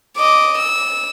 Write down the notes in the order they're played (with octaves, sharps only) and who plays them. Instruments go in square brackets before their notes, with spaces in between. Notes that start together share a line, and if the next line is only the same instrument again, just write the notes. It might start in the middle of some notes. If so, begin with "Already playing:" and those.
[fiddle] D#5 D6
E6